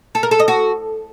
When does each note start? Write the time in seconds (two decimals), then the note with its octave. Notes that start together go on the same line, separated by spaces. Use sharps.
0.15 A4
0.23 A#4
0.31 A4
0.40 D#5
0.48 F#4